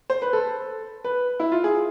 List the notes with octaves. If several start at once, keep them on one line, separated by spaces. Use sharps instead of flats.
C5
B4
A4
B4
E4
F4
G#4